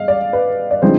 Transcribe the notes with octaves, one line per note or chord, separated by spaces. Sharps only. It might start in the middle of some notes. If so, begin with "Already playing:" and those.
Already playing: D#5 F5
D5
B4
D5
D3 F3 G#3 C4 D#4 C5